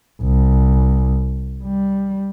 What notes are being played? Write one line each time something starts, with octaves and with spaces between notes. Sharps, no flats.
C2
G3